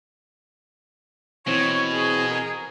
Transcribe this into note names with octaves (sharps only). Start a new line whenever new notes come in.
B2 E3 C4 C#5
G#4
A#4